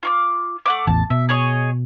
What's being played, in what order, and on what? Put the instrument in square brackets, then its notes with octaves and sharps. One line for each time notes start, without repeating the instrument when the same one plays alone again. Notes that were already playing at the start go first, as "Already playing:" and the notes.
[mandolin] F4 C#6 D6
A3 F#5 D6
[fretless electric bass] A1 E2 [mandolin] A5
[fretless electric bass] B2 [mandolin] E5
[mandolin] G#4 C#5 D#5